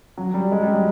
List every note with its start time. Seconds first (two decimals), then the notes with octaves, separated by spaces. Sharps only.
0.18 F#3
0.34 G3
0.52 G#3
0.63 G3
0.74 F#3